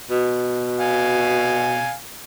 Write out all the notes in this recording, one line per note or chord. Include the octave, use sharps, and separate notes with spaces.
B2
F5 G#5